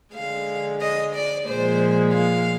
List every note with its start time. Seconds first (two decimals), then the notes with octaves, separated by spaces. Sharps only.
0.13 D3 G#3 F5
0.80 D#5
1.13 D5
1.47 A#2 F3 G#3 C5
2.14 F5